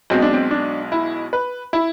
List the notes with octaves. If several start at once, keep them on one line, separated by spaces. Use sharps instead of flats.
B1 B2 G#3 C4
D4
C4
D4
E4
B4
E4